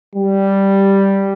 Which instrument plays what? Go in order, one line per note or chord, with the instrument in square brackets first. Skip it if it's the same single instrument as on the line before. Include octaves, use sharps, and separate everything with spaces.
[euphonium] G3